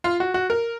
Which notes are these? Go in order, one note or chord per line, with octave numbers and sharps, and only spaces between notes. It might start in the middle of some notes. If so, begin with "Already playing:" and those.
F4
F#4
F#4
A#4